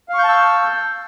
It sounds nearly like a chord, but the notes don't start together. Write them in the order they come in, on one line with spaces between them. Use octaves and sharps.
F5 C#6 G6 A5 E6